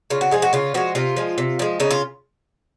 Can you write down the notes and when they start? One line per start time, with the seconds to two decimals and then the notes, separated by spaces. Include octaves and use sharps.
0.10 C#3 F4
0.21 F#4
0.31 F3 G#3 G#4
0.42 F#4
0.53 C#3 F4
0.74 F3 G#3 F#4
0.95 C3 F4
1.17 F3 G#3
1.38 C3
1.59 F3 G#3
1.80 C#3 D#4
1.91 F4